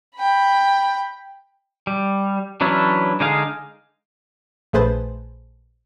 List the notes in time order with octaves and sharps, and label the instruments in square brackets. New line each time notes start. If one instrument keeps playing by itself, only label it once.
[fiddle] G5 B5
[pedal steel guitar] G3
E3 F#3 C#4 D4 E4
D3 G#3 D#4 G#4 F5
[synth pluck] A#1 A3 G#4 B4 C5 A5